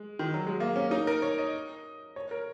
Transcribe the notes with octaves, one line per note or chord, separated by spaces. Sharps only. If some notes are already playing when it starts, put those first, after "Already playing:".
Already playing: G#3
D#3
F#3
G#3
A#3
C#4
D#4
A#4
C#5
D#5
C#5
A#4